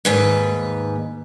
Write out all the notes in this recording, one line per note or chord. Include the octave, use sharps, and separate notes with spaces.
D#2 G#2 B4